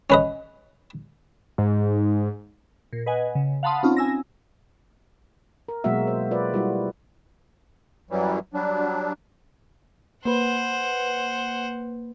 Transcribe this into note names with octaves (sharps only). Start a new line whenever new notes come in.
C#4 B4 D#5
G#2
A#2
B4 D#5 F#5 G#5
C#3
F5 F#5 A5 B5 C6 D#6
C4 C#4 D#4 F4
G#5 E6 A#6
A#4
B2 F#3 G#3 A#3 F#4 E5
C5
F4 B4 D5
G3 E4 F#4
F#2 E3 F#3 G3
F#3 G3 D4
A#3 B4 C5 F#5